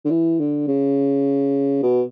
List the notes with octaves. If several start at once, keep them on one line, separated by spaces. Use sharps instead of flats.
D3
E3
D3
C#3
B2